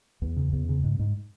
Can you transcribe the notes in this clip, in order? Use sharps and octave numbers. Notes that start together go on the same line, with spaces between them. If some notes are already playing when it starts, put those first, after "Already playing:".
E2
C#3
E2
C#3
G#2
G#2